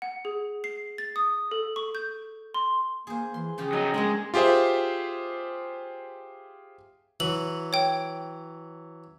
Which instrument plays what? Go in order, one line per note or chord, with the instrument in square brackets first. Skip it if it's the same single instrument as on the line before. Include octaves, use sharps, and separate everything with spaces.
[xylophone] F#5
G#4
C7
A6
D#6
A4
C#6
G6
C6
[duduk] A#3 [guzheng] G#4 C5
[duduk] E3 [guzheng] C6
[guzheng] C#3 F3 G4 [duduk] G#4
[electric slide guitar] F#3 D#4 [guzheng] A#4
[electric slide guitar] G#3 [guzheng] A#3 C#4 D4
[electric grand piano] F4 G4 G#4 C5 E5
[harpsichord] E3 F#3 [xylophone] F#7
[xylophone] C#5 G5